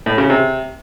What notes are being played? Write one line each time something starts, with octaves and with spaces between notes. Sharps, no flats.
A2
C#3
C3